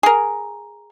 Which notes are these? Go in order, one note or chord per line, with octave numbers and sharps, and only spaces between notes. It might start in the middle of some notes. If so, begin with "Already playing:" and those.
G#4 A#4